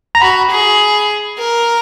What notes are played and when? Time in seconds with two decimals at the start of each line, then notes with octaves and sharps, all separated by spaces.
0.15 A#5
0.21 F#4 B5
0.51 G#4
1.39 A#4